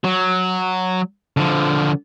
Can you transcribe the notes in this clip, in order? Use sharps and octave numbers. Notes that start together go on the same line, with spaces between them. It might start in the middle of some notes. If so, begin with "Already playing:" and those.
F#3
D3 F3